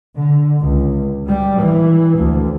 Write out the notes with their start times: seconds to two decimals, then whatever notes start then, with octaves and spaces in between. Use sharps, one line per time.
0.15 D3
0.61 C#2
1.26 G3
1.60 E3
2.17 D2